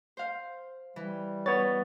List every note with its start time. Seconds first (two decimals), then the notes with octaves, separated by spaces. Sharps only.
0.17 C5 F5
0.96 E3 G3
1.46 B3 C#5 A6